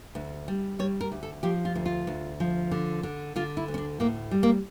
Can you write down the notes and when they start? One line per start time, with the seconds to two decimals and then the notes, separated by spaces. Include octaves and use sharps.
0.15 D2
0.48 G3
0.79 G3 C#5
1.01 A#4
1.12 D2
1.23 A4
1.43 F3 G4
1.65 F4
1.75 D2
1.86 F4
2.07 D2
2.40 F3
2.71 D3
3.03 D3
3.36 D3 F4
3.57 E4
3.68 D2
3.74 C#4
3.78 D4
4.00 A2 A#3
4.31 G3
4.43 A#3